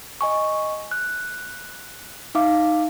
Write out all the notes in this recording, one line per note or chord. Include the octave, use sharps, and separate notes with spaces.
D#5 G#5 C#6
F#6
D#4 E5 F5 D6